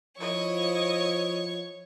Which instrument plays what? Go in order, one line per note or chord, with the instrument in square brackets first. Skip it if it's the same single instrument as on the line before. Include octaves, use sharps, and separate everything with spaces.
[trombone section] F3 [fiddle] E4 D#5 [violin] C#5 C#6